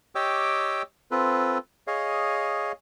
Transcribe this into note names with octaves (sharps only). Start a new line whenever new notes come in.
G4 C#5 D#5 G5 D6 E6
C4 F4 A4 B4
G#4 C#5 D#5 F5